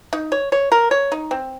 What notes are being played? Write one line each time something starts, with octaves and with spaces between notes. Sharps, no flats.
D#4
C#5
C#5
A#4
C#5
D#4
C4